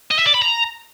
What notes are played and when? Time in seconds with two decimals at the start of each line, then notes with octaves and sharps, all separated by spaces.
0.11 D#5
0.19 E5
0.27 D5
0.34 B5
0.42 A#5